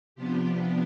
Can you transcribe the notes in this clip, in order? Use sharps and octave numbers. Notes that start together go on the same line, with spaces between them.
C3 F3 B3 D4 G4
G4